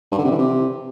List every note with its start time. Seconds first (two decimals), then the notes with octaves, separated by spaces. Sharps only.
0.11 G2
0.18 D3
0.25 C3
0.31 E3
0.38 C3